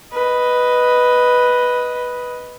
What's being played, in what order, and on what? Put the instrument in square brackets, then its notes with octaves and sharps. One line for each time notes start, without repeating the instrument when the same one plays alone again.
[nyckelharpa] B4 D#5